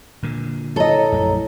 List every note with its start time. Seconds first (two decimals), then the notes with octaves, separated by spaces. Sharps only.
0.23 A#2 D3
0.76 E4 A4 C#5 D#5 A#5
1.12 A#1 F#2 A3